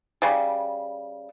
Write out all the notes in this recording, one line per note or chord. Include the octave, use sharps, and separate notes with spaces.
C#3 G3